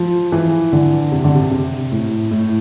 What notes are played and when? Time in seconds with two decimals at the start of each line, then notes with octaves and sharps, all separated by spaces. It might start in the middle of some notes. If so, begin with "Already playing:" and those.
Already playing: F3
0.32 E3
0.73 D3
1.12 C3
1.24 D3
1.35 C3
1.51 C3
1.92 A2
2.31 A2